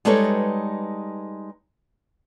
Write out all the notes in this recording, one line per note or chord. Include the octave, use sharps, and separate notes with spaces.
G3 G#3 D#4 A4 B4 C#5